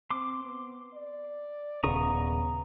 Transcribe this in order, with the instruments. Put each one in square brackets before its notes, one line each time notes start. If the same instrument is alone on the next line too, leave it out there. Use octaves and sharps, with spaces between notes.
[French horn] C4 [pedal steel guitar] C6 D6
[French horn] B3
D5
[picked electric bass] D#1 C#3 [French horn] B3 [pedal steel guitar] A#5 C#6 D#6